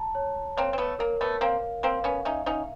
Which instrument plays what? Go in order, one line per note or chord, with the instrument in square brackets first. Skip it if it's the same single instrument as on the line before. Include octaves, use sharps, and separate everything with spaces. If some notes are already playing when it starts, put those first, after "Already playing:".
Already playing: [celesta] A5 A#5
C#5
[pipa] A#3 C4 [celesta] C#5
[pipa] C4
A3 B3
[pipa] A#3 [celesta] A#4
[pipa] A3 B3
[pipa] A#3 C4 [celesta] F5
[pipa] A#3 C4 [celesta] F5
[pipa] B3 C#4
[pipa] C#4 D#4 [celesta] E5
[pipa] C#4 D#4